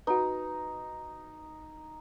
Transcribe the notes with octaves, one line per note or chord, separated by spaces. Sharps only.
D#4 F#4 B4